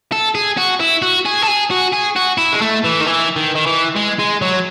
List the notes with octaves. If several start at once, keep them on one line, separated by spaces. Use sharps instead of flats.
A4
G#4
F#4
E4
F#4
G#4
A4
G#4
F#4
G#4
F#4
E4
G#3
A3
E3
D#3
E3
D#3
D#3
E3
G#3
G#3
F#3